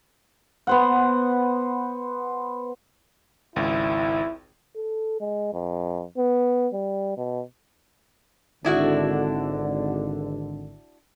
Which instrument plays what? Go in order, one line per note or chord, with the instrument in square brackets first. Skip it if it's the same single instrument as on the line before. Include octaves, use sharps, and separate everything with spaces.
[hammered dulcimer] B3 C5 F#5
[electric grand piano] G#1 C#2 [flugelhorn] E4
[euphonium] A4
G#3
F2
B3
G3
B2
[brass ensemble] G#1 D3 [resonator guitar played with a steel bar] D4 E4 F#4